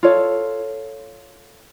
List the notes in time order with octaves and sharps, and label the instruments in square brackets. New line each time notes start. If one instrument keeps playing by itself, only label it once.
[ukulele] F4 A4 C#5 F5